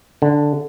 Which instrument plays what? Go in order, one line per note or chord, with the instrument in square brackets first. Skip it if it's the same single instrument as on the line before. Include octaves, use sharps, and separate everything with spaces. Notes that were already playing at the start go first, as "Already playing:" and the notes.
[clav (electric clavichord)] D3